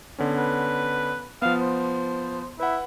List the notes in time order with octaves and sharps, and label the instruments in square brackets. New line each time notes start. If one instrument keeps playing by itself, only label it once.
[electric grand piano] D3 B3 C#4
[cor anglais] B4
[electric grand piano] F3 B3 [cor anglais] F5
[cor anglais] C5
[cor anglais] E4 [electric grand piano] B4 F#5